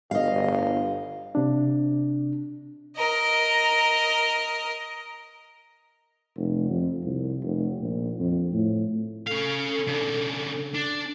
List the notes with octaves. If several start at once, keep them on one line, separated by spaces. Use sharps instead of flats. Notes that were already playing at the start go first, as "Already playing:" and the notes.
G1 D#5 F5
C3 D4
A#4 D#5
F1
F2
C2
F1
A#1
F2
A2
C#4 A4 F5
C#3 D4
D4